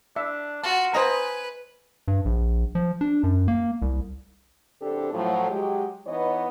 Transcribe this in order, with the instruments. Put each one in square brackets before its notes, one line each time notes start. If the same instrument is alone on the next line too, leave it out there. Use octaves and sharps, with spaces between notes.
[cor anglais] D4 [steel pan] E5
[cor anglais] F4 [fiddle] F#4 [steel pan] A5
[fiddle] B4 [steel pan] C5 D#5 A#5 [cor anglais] G#5
[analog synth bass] G2
A#1
F3
D4
F#2
A#3
C2
[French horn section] E2 C3 D4 G4 A4
A2 F3 F#3
F#3 G#3 G4
E3 B3 D#4 B4 C#5 D#5